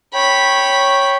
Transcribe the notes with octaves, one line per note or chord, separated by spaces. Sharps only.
C#5 G5 B5